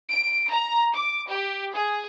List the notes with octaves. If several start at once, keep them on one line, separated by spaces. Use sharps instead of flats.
D7
A#5
D6
G4
G#4